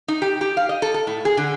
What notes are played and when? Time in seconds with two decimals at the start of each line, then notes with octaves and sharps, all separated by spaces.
0.08 D#4
0.22 G4
0.41 G4
0.57 F5
0.69 D#5
0.82 A4
0.94 A4
1.07 A2
1.25 G#4
1.37 D3